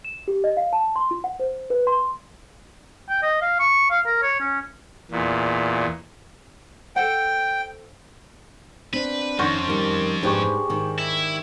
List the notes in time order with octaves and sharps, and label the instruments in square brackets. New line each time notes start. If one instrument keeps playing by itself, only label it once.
[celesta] E7
G4
D#5
F5
A5
C6
F4
F#5
C5
B4
C6
[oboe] G5
D#5
F5
C#6
F5
A#4
C#5
C#4
[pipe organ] E2 A#2
[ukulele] A4 C5 F#5 [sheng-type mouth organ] G5
[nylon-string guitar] C4 [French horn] D4 [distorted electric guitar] B4
[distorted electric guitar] F2 [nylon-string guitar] D#3 F#5 [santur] C#4 C5
[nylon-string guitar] D#3 G3 [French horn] A#4
[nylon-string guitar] G#2 B4 C5 [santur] D4 G4 C#6 [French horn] G#4
[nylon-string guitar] G#2 D#3
[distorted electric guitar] E4